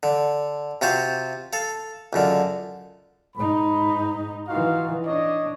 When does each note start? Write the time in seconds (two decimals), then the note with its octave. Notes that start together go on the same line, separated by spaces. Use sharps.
0.03 D3
0.81 C3 F4 F#4 C5 F5
1.53 A4 F5
2.13 C#2 F#2 D3
3.36 G#2 D#4 B5
4.48 E3 D#4 F4 F#4 F5
5.06 D4 C#5 D#5